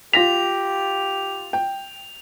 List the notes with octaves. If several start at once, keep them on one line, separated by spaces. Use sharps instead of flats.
F4 G4 A#6 B6 F7
G5